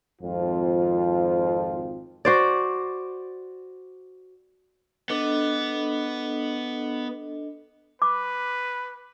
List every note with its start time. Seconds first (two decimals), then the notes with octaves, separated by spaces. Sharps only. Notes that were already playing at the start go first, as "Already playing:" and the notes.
0.22 G#1 F2 F3 C4 F4
2.25 F#4 C5 D5
5.10 B3 D4 A4 D#5
8.02 B4 D6